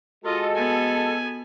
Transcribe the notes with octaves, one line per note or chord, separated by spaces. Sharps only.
G#3 F4 F#4 A4 D#5
B3 G#5